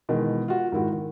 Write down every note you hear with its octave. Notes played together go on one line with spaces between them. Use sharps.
B2 D#3 E3 G#3
F4 F#4
G#2 D#3 E4 F#4
D#3